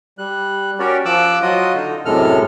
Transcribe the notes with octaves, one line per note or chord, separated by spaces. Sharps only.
G3 F#6
C#4 F#4 G4 A#4 C#5 D5
F3 D6 E6 F#6
F#3 F4 F#4 D#5 D#6
D3 D#4
F#2 A2 C3 G#3 A4 F6